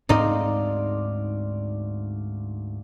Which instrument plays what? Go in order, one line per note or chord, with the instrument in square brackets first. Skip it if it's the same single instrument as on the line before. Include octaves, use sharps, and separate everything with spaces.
[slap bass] D2 G#2 C4 [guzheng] D#4 D#5 [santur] D5 F5 C6